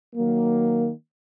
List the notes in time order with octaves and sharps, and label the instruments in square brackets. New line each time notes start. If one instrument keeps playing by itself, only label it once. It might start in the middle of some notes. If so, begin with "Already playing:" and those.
[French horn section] D#3 F#3 A#3